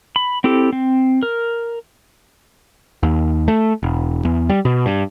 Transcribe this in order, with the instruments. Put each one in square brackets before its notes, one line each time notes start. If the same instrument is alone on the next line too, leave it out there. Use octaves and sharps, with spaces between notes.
[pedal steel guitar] B5
C4 E4 G4 A4
C4
A#4
[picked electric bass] D#2
A3
E1
E2
G3
B2
G2